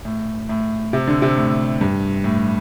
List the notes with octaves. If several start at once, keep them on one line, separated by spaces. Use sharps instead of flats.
A2
A2
C3
D3
C3
A2
G2
A2